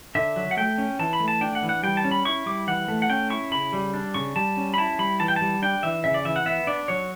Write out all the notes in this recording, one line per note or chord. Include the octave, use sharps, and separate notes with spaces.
D3 E5
F#3
F#5
A3 G5
C#4
E3 A5
B5
A3
A5
D4 G5
F#5
E3
F#5
G3 G5
A5
C#4
B5
E4 C#6
G3 D6
E3 F#5
A3
F#5
C#4 G5
E4 C#6
C#3 B5
G3
D4
C#3 C#6
G3 A5
C#4
B5
E4 A5
G3 B5
E3 A5
G5
G3 A5
D4 G5
E3 E5
C#3 E5
D5
E3 E5
F#5
B3 E5
D4 D5
F#3 C#5